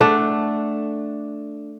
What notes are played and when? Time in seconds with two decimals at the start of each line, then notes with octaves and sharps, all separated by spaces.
0.01 A3 D4 F#5